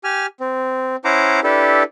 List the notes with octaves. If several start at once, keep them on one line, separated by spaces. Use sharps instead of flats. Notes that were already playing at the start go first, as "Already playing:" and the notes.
G4 G#5 F6
C4
C#4 E4 C5 F#5 A#5 D6
D4 E4 G4 A4 B4